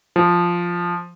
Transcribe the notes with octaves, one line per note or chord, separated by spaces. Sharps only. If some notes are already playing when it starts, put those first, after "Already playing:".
F3